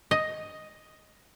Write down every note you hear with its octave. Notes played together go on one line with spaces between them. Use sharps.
D#5